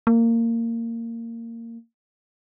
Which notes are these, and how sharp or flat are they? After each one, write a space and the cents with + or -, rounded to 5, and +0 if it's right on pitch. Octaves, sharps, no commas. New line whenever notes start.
A#3 -20